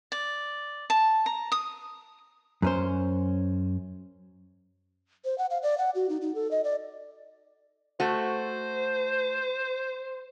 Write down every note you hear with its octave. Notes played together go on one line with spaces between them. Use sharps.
D5
A5
A#5
D#6
F#2 C#4 C5
C5
F#5
F5
D5
F#5
F#4
D#4
D#4
A4
D#5
D5
A3 F#4 C5